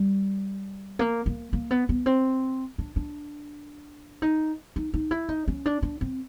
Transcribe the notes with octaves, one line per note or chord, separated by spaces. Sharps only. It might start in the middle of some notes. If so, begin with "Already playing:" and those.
Already playing: G3
A#3
A#3
A#3
B3
B3
C4
D4
D4
D#4
D#4
D#4
E4
D#4
C#4
D4
D4
C4